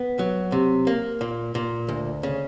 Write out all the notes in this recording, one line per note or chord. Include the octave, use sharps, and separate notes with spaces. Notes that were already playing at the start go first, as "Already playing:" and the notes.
Already playing: B3
F#3
C3
A#3
A#2
A#2
D2
C#3